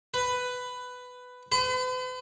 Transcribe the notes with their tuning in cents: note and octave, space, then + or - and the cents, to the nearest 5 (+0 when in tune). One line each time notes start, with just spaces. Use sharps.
B4 +10
B4 +45